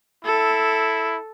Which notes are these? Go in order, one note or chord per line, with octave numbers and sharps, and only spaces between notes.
E4 A4